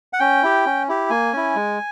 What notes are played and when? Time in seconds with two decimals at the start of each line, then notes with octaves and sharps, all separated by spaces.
0.13 F#5
0.19 C#4 G5
0.43 E4 G4
0.66 C#4
0.89 E4 G4
1.10 A#3 G#5
1.33 C#4 E4
1.56 G#3